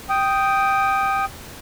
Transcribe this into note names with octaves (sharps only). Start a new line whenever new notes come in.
G5 D#6